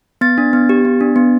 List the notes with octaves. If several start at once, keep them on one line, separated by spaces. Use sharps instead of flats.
B3 A6
D4
B3
G4
B3
D4
B3